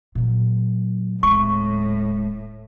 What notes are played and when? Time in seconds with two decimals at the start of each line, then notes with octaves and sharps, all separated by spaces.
0.15 A#2 F#3
1.23 D1 A2 G#3 C#6